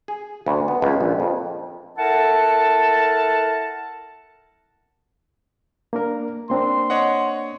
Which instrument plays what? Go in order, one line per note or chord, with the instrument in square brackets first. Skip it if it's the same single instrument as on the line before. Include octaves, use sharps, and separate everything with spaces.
[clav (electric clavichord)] G#4
D2
B3
C#2
A#1
F2
[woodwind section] E4 A4 A#4 F#5 A5
[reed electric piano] A#3 D4 A#4
[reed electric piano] A#3 C4 D4 [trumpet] C6
[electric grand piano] C#5 D#5 F#5